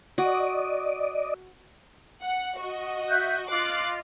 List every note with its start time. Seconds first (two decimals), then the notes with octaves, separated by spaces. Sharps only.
0.18 F#4 D5 D#5
2.22 F#5
2.59 F#4 D#5
3.08 E5 F#6 G6
3.49 F4 D#5 D6 F#6 C7